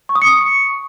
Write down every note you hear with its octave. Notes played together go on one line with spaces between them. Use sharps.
C#6
D#6
C#7
C#6